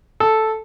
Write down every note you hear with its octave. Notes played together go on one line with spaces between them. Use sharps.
A4